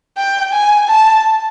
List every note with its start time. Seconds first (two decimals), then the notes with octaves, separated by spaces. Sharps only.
0.18 G5
0.53 G#5
0.89 A5